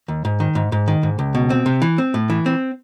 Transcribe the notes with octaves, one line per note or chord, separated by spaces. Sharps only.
D#2
G#2
D#3
G#2
G#2
D#3
G#2
C#2
B2
C4
C3
E3
C4
A2
E3
C4